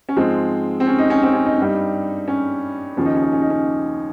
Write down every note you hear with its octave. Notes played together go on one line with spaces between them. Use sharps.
C#4
G#2 F3 G#3 C4
C4
C#4
D#4
C#4
C4
C#4
D#4
G2 G3
C#4
D#2 C#3 F3 C#4
D#4
C#4
D#4
C#4
D#4
C#4